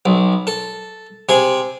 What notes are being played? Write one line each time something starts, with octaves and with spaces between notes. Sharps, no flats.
B1
A4
C3 G#4 G#5